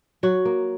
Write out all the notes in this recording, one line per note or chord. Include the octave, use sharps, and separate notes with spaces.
F#3 F#4
A#3